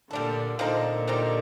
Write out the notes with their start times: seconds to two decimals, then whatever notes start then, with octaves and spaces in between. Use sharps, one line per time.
0.11 A#2 D3 G3 D4 A4
0.59 A#2 D3 F3 C4 D#4 A4
1.08 G3 C4 D#4 G4